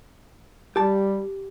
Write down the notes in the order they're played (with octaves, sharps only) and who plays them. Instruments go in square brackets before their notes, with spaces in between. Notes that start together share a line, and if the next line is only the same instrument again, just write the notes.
[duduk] G3 [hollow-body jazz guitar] G4 A5